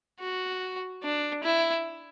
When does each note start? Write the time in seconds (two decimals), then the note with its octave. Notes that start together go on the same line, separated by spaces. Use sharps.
0.20 F#4
1.03 D4
1.44 E4